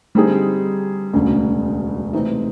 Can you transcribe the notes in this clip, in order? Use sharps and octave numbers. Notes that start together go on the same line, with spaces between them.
D3 G3 C4 D#4 G#4
E1 D2 C#3
C3 E3 A3 C4 D#4